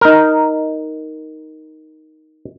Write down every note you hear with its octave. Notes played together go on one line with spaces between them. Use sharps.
D#4 A#4